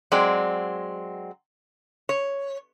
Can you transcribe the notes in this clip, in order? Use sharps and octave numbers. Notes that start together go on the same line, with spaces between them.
F#3 G#3 C4 D5
C#5